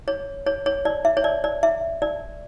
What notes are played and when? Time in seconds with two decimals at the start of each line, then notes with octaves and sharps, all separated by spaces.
0.08 C#5
0.47 C#5
0.66 C#5
0.85 D5
1.05 E5
1.17 C#5
1.24 D5
1.44 D5
1.63 E5
2.02 D5